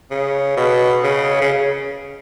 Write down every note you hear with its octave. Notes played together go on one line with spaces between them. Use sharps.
C#3
B2
C#3
C#3